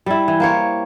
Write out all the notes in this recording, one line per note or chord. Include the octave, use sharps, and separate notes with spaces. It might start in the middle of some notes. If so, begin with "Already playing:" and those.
G3 E4
E3
A#3 C5 C#5